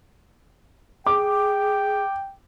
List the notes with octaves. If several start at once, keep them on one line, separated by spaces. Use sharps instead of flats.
G#4 G5 D6